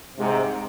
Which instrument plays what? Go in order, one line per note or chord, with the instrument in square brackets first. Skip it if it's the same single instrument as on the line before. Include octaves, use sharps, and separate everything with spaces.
[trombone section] G#2 C3